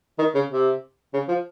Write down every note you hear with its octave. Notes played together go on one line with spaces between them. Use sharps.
D#3
C#3
C3
C#3
F3